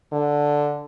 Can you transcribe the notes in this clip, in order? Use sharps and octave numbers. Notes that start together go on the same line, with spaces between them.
D3